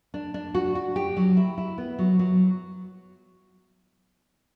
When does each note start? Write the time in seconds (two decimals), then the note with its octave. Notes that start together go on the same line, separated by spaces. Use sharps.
0.14 D4
0.34 D4
0.54 F#4
0.75 F#4
0.96 G4
1.17 F#3
1.37 E4
1.58 E4
1.78 B3
1.99 F#3
2.19 F#3